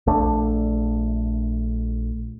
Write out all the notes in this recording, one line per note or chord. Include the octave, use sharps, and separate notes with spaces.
A#1 A3 D4